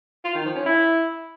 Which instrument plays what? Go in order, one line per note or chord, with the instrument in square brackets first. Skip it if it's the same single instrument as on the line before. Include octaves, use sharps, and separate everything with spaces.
[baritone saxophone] F4
D#3
F3
C#4
E4